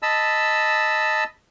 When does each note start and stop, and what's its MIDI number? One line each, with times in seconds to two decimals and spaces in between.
0.02 1.24 75
0.02 1.24 81
0.02 1.24 83
0.02 1.24 88